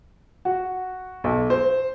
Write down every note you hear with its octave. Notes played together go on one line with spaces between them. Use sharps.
F#4
B1
C5